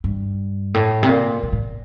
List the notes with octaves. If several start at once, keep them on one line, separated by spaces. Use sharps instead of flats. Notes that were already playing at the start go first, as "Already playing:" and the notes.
G2
A2
C3
A#2
A#2
A2